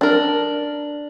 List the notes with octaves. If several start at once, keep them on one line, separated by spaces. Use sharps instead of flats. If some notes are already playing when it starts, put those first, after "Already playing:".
D4 A#4